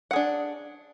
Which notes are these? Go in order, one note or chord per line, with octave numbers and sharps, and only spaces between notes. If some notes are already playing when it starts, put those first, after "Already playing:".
D4 G#4 F#5